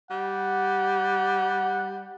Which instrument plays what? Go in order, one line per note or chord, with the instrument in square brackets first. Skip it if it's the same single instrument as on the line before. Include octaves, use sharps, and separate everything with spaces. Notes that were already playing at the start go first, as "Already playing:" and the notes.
[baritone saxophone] G3 [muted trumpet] F#5